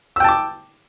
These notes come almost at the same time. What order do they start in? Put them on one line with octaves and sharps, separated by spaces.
E6 G5 A5 D6